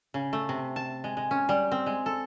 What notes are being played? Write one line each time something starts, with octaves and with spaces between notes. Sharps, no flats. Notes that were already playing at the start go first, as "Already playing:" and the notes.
C#3
A3
C3
A5
G#3
G#3
C#4
G3
C4
G#3
A4